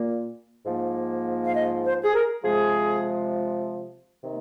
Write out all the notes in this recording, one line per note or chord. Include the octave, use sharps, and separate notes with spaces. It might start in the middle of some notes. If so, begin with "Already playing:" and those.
Already playing: A#2 A#3
G#2 F3 A#3
F5
D#5
C5
G#4
A#4
C3 F3 G#3 G#4
C3 D#3 A#3